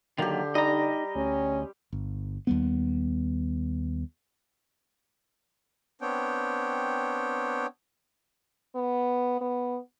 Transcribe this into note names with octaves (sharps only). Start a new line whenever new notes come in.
D3 D#3 F#3 A#3 G4 C6
G3 D#4 D#5 A#5
D2 C#4
G1
D#2 G3 B3
B3 C4 D4 C#5 G5
B3
B3